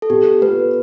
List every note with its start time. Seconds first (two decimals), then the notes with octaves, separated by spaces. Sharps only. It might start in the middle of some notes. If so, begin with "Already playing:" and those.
0.02 A4
0.10 B2 G4
0.42 B3 F4 A4 B4